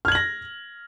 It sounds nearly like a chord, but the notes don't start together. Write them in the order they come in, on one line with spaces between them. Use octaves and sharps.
F6 G#6 F#7 A#6